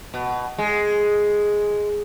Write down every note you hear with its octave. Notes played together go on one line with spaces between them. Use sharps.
B2
G#3